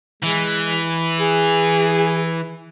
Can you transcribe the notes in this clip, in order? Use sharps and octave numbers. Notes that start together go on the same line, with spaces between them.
E3 G#3
G#4